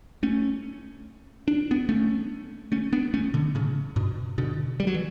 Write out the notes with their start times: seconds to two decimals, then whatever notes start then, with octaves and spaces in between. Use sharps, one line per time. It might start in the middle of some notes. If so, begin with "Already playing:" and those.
0.23 A3 C#4
1.48 D4
1.71 B3 D4
1.89 A3 C#4
2.72 A3 C#4
2.93 B3 D4
3.14 A3 C#4
3.34 B2 D3
3.55 A2 C#3
3.96 G2 B2
4.38 B2 D3
4.80 G3
4.87 F#3
4.94 E3